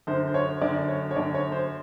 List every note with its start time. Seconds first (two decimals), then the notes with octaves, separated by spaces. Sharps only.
0.07 F#2 D3 C5
0.27 C5
0.34 C#5
0.62 F#2 D3 D5
0.88 C#5
1.11 C#5
1.16 F#2 D3 D5
1.35 C#5
1.52 C5